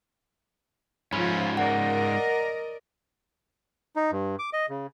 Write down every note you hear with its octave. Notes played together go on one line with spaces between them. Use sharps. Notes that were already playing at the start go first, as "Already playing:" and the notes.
G#2 F3 C#4 F4 B5
A#4 D5 D#5 F#5
D#4
G2
D6
D#5
C#3